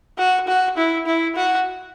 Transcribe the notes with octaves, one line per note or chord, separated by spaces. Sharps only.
F#4
F#4
E4
E4
F#4